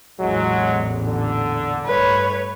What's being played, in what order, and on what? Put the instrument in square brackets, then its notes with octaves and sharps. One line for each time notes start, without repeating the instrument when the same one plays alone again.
[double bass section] A1 E2 A#2 [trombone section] F#3 G#3
[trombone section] D3
[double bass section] G2 A3 [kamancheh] B4 C#5